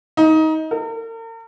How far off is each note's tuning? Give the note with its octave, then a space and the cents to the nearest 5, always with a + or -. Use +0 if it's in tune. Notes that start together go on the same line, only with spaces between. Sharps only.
D#4 +20
A#4 -45